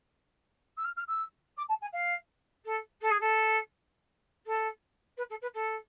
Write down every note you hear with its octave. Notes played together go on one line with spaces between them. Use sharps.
E6
F6
F6
E6
D6
A5
G#5
F5
A4
A4
G#4
A4
A4
B4
A4
B4
A4